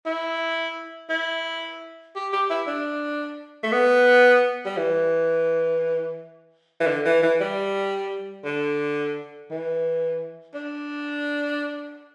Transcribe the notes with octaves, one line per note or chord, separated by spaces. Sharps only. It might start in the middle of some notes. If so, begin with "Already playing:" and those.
E4
E4
G4
G4
E4
D4
A3
B3
G3
E3
E3
D3
E3
E3
G3
D3
E3
D4